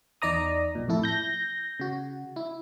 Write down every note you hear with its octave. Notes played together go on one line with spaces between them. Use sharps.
E2 D#4 D5 A#5 D#6
B1 A#2
F2 A2 E4 A4
G6 A#6
C#3 F#4
E4